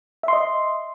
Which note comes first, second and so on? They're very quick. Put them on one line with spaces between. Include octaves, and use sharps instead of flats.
E5 C6 D#5